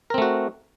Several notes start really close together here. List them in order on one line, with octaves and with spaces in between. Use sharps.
A#4 C4 A3 F#4